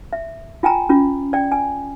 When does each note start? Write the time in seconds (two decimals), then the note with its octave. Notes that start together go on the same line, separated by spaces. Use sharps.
0.13 E5
0.63 F4 G5 G#5 A#5
0.89 C#4 F4
1.33 D5 G5
1.52 G#5